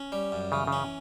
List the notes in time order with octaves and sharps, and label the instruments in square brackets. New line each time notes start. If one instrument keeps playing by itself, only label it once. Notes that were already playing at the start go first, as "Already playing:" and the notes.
Already playing: [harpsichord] C#4
G3
F#2
[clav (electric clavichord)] C#3 [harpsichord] E3
[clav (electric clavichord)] C#3
[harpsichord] C#4